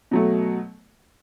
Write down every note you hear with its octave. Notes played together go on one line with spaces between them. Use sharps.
B2 F#3 A3